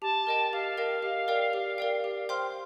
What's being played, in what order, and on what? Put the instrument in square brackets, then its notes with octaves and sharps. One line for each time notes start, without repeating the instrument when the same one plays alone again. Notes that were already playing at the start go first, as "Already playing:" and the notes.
[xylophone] G4 [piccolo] A5
[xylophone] A#4 D#5 G5
[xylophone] G4 [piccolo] F5
[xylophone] A#4 D#5 G5
G4
A#4 D5 G5
G4
A#4 D5 G5
G4
C5 G5 C6 F6